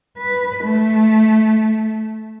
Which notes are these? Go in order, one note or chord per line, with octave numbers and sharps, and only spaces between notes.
B4
A3